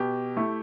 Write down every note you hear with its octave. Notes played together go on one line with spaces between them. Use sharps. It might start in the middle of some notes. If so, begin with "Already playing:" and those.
Already playing: B2 G4
A3 E4